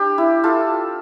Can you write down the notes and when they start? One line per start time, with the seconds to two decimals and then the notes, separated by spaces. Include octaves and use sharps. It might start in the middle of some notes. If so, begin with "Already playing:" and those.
Already playing: D4 G4
0.18 E4
0.44 F4 A4